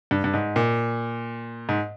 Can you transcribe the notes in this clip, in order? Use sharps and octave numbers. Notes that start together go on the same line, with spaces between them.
G2
G2
G#2
A#2
G#2